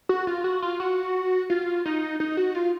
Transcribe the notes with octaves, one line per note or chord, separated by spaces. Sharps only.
F#4
F4
F#4
F4
F#4
F4
D#4
D#4
F#4
F4